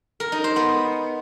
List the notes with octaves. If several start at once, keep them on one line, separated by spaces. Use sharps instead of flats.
A#4
D#4
C5
B3